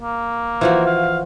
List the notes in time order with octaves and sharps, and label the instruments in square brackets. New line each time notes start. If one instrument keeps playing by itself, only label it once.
[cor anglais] A#3
[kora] E3 F3 F#4
[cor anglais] F5